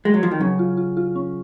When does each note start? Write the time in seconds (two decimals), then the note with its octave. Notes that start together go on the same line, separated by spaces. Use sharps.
0.05 G#3
0.14 F#3
0.23 F3
0.31 D#3
0.40 C#3 F#3
0.59 F4
0.77 F4
0.97 F4
1.16 C#4